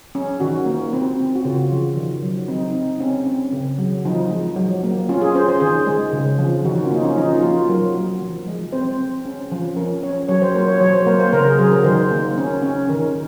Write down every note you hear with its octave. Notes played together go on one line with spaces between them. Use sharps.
C#4
D#3 F#4
A#3
C4
C4
F#4
C#3 F4
F3
D#3
F#3
C4 D#4
C4 D#4
C4 C#4
C4
C#3
F#3
F3 D#4
G#3
F#3
A#3
C#4 F4
G#4
C#4 C5
C5
D#3 G#4
G#3
C#3
F3
D#3 F#4
F4
C#4
A#3 D#4
C#4
F3 D#4
F4
A#3 F#4
F#3 A#4
A#3
F3
G#3
C4 C5
C4
C#4
F3
C#4 A#4
C#4 C#5
F#3 C#5
C5
A#3 A#4
C#5
F#3 C#5
C5
A#3 A#4
C5
C#3 A#4
G#4
F#3 G#4
A#4
D#3 C5
A#3
C#4
C#4
D#3 A#4